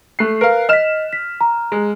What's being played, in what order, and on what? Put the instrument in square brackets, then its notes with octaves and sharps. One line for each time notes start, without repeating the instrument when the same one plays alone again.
[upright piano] A3 F#6 C7
[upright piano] A#4 F5 [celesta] B4
[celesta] D#5 B6 [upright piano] F6 E7
[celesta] B6
A#5
[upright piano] G#3